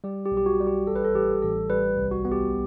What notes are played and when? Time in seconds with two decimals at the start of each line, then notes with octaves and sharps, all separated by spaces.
0.04 G3 G4
0.25 G4
0.31 B1
0.37 G4
0.46 F#4
0.60 G3
0.67 G4
0.87 A1 A4
0.96 B4
1.05 A4
1.15 A1 G4
1.42 A1 A4
1.70 G3 B4
1.97 C2
2.11 F#4
2.25 B3
2.32 G4